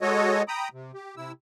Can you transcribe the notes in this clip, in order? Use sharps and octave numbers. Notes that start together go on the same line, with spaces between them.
G#3 F#4 A4 C#5 D#5
G5 A#5 B5 D#6
C3
G4
C3 E4 E6